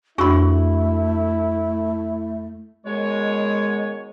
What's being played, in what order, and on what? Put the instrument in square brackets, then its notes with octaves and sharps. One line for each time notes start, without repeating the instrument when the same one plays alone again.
[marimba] F2 D4 E6 [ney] A3 [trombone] E4 [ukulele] F#4 B5
[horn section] B2 D#3 C#5 [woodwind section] G#3